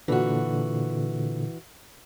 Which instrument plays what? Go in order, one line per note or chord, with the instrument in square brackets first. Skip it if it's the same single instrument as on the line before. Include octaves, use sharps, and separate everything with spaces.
[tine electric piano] A#2 D3 [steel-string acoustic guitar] E3 F#4